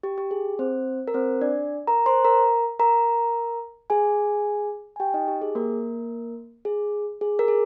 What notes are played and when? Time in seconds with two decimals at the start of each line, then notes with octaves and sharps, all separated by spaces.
0.03 G4
0.18 G4
0.31 G#4
0.59 C4 C5
1.08 A#4
1.14 C4 C5
1.41 D4 D5
1.87 A#4 A#5
2.06 C5 C6
2.24 A#4 A#5
2.80 A#4 A#5
3.90 G#4 G#5
4.96 G#5
5.00 G4 G5
5.14 D#4 D#5
5.28 G4
5.42 G#4
5.55 A#3 A#4
6.65 G#4
7.21 G#4
7.39 A#4
7.48 G#4